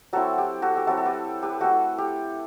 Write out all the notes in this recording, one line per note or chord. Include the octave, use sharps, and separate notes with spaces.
F#3 C4 E4 F#4 A4
G4
F#4 A4
G4
F#3 C4 E4 F#4 A4
A4
G4 B4
G4 B4
A3 E4 F#4 A4
G4